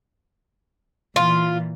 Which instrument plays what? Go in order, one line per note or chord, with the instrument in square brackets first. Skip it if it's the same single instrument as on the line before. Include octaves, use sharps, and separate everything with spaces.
[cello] A#2 E3 [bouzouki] F4